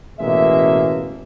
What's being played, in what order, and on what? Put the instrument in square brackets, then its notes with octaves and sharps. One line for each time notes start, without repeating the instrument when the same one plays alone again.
[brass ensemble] A1 B2 G#3 A#3 E5